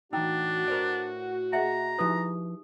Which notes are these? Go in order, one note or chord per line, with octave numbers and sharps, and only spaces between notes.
A2 E3 D4 D#4 F#4 G5 E6
A#4 C5 D5
G#4 D#5 E5 F#5 A#5
F3 D#4 E4 G4 B4 D#6